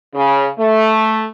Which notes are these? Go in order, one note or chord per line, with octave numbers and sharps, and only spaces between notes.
C#3
A3